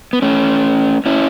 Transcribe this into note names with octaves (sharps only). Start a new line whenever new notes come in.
B3
A3 C#4
C#4 E4